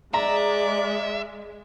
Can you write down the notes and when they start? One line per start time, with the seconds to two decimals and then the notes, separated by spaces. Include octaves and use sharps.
0.14 G#3 D5 E5 A#5